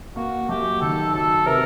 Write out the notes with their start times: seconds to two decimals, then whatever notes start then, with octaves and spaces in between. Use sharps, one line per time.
0.16 A#3 F#4
0.49 F#2 G4
0.81 D#3 A4
1.14 F#3 A4
1.46 C3 A#4